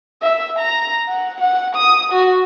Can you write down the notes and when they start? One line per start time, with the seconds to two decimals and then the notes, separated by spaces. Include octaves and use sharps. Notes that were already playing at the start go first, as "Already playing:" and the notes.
0.22 E5
0.59 A#5
1.09 F#5
1.40 F#5
1.76 D#6
2.12 F#4